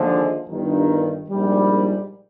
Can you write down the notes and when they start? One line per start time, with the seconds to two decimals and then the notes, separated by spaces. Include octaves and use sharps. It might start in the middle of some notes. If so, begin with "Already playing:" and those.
Already playing: D#2 D3 F3 G#3
0.49 G1 G2 D#3
1.30 A#1 G#2 G3